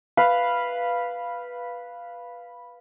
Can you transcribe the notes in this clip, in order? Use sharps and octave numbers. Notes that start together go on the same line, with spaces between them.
B4 F5